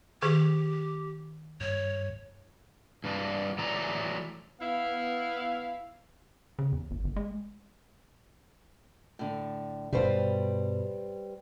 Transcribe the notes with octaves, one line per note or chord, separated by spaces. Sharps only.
D#3 G4 G#4
G2 C#5
G2 E3 D4
E3 F#3 A3 D5 A#5
B3 E4 F5
C#3
E2
G1
G1
G#3
A2 D3
G2 B2 G3 B4 C5